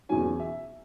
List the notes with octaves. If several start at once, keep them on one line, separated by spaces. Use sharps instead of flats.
E2 B2 F#3 C#4 G#5
E5